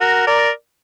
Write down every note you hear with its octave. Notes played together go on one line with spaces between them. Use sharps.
F#4 A#4
A#4 D5